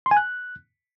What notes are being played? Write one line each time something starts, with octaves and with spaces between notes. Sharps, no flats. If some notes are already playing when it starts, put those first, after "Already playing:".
C6
G#5
F#6